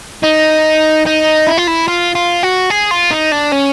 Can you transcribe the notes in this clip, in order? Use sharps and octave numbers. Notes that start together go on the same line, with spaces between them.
D#4
D#4
E4
F4
E4
F4
F4
F#4
G#4
F4
D#4
D4
C#4